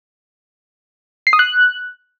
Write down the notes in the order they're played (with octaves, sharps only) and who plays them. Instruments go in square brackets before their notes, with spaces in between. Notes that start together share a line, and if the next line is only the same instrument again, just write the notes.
[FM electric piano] C7
D#6
F#6